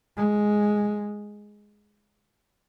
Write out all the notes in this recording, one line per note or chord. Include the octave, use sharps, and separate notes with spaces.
G#3